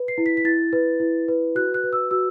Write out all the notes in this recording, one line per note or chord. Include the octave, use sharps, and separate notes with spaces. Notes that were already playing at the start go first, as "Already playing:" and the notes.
Already playing: B4
C7
E4
B6
B6
E4 A6
B4
E4
B4
F#4 F#6
F#6
B4
E6
F#4 E6